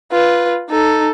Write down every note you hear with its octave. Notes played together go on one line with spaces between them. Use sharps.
F4 B4
D#4 A4